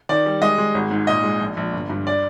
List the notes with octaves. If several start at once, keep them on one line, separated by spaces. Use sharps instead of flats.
D#3 D5
G3
G#3 D#5
G#3
G#1
G#2
A#2 D#5
G#3
A#1
A#1
G1
G2
D5